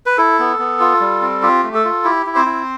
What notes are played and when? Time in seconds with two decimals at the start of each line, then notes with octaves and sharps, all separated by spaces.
0.06 B4
0.18 E4 A4
0.39 B3
0.59 B3
0.80 F4
1.01 G3
1.22 C4
1.42 F4 G4
1.64 A3
1.74 A4
1.85 F4
2.04 E4 G4
2.26 E4
2.35 C4 C5
2.46 E4